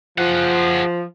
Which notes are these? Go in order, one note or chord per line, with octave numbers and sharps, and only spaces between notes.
F3 G#4 F#5